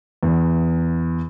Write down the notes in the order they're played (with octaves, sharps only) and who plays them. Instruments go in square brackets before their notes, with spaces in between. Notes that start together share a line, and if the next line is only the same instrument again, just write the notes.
[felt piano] E2